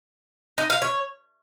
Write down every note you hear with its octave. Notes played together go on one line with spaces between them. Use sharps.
D#4
F5
C#5